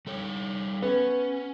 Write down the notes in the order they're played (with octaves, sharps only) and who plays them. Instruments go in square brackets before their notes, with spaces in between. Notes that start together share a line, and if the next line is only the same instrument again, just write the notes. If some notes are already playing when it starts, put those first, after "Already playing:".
[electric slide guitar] G3 A4 C#5
[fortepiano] B3 [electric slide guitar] C#4